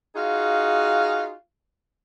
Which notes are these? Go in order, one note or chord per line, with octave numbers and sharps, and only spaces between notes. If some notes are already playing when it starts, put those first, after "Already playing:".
D#4 F4 F#4 G#4 F5